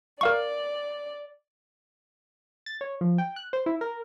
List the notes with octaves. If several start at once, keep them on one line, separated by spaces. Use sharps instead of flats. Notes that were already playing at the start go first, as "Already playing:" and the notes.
A#4 D5 F5 C#6
A6
C#5
F3
G5
F#6
C5
E4
A#4